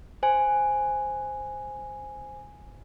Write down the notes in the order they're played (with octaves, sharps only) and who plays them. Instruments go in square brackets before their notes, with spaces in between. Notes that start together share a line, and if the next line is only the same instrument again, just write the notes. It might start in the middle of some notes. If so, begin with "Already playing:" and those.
[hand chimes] C5 G#5